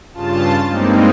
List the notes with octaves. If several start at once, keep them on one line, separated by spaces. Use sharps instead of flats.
G2 C#3 F4 A5
G2 G3 G#3 A#3 C4 D#4